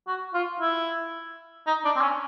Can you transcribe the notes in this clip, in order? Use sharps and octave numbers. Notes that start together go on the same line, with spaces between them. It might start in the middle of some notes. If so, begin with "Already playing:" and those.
F#4
F4
E4
D#4
D4
C4
C#4